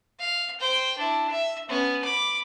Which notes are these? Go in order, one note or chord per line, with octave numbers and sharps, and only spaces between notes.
F5
C5 G5
D4 E4
E5
B3 C#4
B5 D6